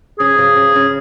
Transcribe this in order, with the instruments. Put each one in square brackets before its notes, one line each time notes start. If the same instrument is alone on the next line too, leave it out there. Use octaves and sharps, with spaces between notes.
[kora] C#3 [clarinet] G#4
[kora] C#3
C#3
C#3